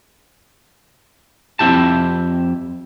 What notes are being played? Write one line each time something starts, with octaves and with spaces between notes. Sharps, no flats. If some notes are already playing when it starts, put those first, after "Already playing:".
F2 C4 E4 G4 A5